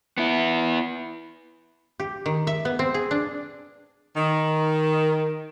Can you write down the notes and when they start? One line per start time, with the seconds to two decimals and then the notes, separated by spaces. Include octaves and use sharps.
0.18 B3 E4
2.00 G4
2.26 D#3
2.47 E5
2.65 B3
2.79 C4
2.94 G#4
3.11 D4
4.17 D#3